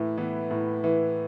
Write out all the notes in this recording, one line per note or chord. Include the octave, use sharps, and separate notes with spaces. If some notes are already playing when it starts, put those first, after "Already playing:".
Already playing: A2 E3
E3 B3
A2
E3